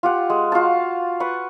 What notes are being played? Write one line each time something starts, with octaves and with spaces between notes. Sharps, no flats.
F4 G4 F#5
G#3
F4 F#4 A5
B4 F#5 C#6